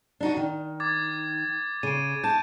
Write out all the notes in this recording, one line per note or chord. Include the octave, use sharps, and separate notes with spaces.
D4 D#4 F#4
D#3
D6 G#6 A6
C#3 D7 D#7
A5 G6